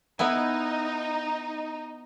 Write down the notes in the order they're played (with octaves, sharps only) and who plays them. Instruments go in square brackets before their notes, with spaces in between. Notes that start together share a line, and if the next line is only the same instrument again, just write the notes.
[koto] B3 E4 G#5 [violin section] D#4